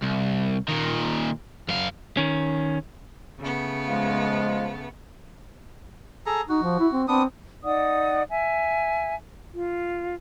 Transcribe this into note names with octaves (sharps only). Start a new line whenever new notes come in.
C2
A#2 D#3
F#2 F5
D#3 C#4
C#3 A3 B3
F3 G#3
G#4 A4 A#5
D#4 F#4
F3
E4
C4
B3 C4 D4 D#6
D#4 D5 F#5 D#6
E5 G#5
F4